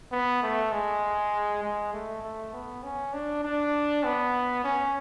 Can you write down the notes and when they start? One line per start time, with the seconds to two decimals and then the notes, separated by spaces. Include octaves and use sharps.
0.12 B3
0.43 A3
0.72 G#3
1.63 G#3
1.93 A3
2.23 A3
2.53 B3
2.83 C#4
3.13 D4
3.43 D4
4.04 B3
4.64 C#4